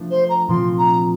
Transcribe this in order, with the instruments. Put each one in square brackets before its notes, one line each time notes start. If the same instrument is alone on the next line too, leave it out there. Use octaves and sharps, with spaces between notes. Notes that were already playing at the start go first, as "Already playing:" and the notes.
Already playing: [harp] F3 A3 D4
[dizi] C5
A#5
[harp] A#2 F3 C4 F4 [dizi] C6
[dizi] A#5